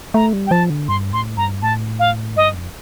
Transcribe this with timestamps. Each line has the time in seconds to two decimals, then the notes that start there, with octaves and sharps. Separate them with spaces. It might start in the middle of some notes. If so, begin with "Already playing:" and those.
0.14 A3 A#5
0.33 G3
0.47 G5
0.51 F3 A5
0.70 D3
0.88 G2 C6
1.13 A2 C6
1.37 G2 A#5
1.62 A2 A5
1.99 F5
2.36 G2 D#5
2.55 F2